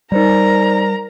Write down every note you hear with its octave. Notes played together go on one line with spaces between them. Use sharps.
G3 D#4 A#4 C5 D5 A#5